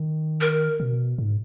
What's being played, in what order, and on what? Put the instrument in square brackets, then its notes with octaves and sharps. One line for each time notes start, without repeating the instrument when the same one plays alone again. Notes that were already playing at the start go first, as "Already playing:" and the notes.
Already playing: [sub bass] D#3
[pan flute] A#4
[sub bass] B2
G#2